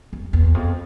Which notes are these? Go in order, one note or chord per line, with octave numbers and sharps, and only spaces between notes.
F2
E2
F2